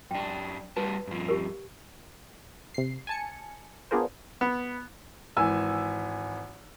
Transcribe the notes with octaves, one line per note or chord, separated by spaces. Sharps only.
F#2 D4 G5
G3 F#4 B4 A5
G2 F3
G4 A#4
C3 C7
G#5 A5 C#7
B3 D4 F4 G#4 A#4 C5
B3
G#1 E3 G#5 E6